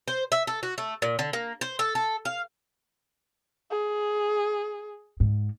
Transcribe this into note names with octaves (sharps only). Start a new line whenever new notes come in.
C5
E5
A4
F#4
A3
A#2
D3
A#3
C5
A4
A4
F5
G#4
G#2